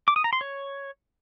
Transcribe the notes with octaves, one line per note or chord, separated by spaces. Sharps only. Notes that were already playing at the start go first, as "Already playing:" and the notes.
D6
D#6
A#5
C6
C#5